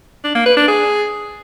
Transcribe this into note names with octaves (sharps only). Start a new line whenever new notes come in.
D4
A#3
B4
D4
G#4